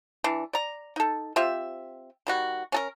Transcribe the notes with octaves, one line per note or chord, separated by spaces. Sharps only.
E3 D4
D5 A#5
D#4 A4
C4 F4 G4 E5
D#3 G3 F#4
C#4 A4 A#4